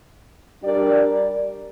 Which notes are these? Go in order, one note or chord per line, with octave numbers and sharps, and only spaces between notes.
G3 D4 G4 A#4 D5